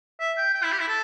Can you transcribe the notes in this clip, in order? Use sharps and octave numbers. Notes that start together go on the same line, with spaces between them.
E5
G5
G5
E4
G4
E4
A4